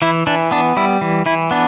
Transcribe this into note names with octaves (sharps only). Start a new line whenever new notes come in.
E3 E4
E3 D4
B3 D4
G3 E4
E3
E3 E4
B3 D4